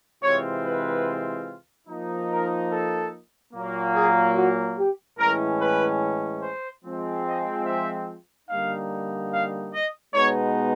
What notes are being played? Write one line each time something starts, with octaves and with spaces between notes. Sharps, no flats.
C3 E3 G#3 C4 F4 C#5
B4
F3 A#3 D#4
A#4
A4
A#2 F#3 A#3
G#4
F#4
G4
A2 E3 G#3 C#4 A#4
B4
C5
F3 G#3 C4
D#5
E5
D3 G3 A#3 D#4 F5
F5
D#5
B2 G#3 B3 D#4 C#5